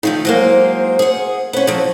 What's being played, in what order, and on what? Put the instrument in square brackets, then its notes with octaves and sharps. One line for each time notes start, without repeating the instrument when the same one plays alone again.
[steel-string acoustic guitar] D#3 F3 A3
[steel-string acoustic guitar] F#3 G#3 A#3 [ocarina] C5
[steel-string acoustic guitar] G#4 F#5
[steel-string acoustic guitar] B3 C#4 [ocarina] C5
[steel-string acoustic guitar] F3 F#3